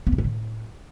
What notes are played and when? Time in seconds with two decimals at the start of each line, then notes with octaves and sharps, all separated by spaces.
0.07 B3
0.13 D#3
0.18 D3
0.24 A2